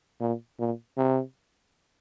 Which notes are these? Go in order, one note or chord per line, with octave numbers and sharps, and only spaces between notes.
A#2
A#2
C3